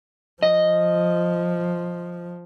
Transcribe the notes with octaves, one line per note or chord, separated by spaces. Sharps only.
F3 D#5